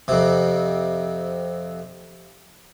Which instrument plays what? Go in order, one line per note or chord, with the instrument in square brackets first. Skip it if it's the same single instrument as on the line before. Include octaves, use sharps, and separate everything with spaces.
[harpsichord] F2 C3